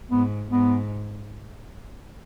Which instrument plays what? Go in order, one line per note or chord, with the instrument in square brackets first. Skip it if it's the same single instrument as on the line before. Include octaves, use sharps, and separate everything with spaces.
[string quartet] G#2 [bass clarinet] B3
[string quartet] G#2 [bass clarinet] B3